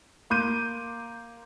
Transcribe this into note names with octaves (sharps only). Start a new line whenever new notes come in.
A#3 C6 D6 G6 D#7